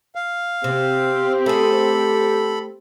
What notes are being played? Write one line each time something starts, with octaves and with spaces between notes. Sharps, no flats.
F5
C3 C4 G4
A3 G#4 A4 B5